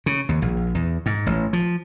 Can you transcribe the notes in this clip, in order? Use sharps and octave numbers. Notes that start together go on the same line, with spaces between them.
C#3
D#2
A#1
E2
G#2
A1
F3